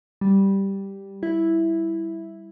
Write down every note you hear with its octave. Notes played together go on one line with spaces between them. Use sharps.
G3
E4